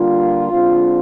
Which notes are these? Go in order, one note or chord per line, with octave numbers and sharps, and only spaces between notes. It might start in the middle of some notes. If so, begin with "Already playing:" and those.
Already playing: D3 G3 A#3 F4
D3 G#3 C4